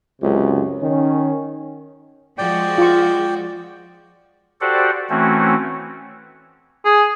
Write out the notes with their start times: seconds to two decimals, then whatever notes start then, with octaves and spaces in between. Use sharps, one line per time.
0.22 C#2 F#2 C3
0.82 D#3 C#4
2.38 F3 G#3 F#4 D5 G5
2.78 F4 C#6
4.61 F#4 G4 A4 C5 D5 F#5
5.10 E3 A3 C4 C#4 F#4
6.85 G#4